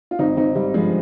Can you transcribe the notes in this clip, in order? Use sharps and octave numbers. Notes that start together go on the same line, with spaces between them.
F4
G#1 C4 D#4
G#1 C4 D#4
G#1 G3
G2 F3 G#3